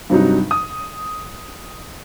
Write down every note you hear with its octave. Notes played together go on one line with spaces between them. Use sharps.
G2 C3 F#3 D#4
D#6